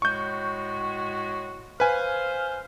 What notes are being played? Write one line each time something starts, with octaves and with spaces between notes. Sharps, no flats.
A2 G#3 F#4 C#6 G6
B4 C5 F5 G#5